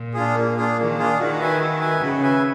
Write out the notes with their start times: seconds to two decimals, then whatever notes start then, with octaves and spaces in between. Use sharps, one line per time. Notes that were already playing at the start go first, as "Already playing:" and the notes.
Already playing: A#2
0.14 D4 F4 G#4
0.35 A#3
0.56 D4 F4 G#4
0.77 D#3 A#3
0.98 D4 F4 G#4
1.18 D#3 F#4
1.39 B4 E5 G#5
1.60 F#4
1.80 B4 E5 G#5
2.01 C#3 F#4
2.22 B4 E5 G#5